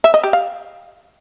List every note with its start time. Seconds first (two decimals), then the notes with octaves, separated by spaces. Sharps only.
0.04 E5
0.14 D#5
0.23 G4
0.33 F5